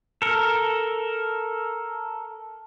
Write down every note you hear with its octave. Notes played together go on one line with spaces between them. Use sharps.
A4 A#4